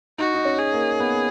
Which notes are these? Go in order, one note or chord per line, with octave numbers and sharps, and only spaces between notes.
D#4 F#4
D#4
C#4
G#4
A#3
B3